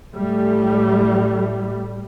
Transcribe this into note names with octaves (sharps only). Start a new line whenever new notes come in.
A2 G3 A3